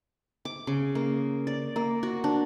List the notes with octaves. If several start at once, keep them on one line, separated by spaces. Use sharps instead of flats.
D6
C#3
A#3
D5
A#3
F#4
D4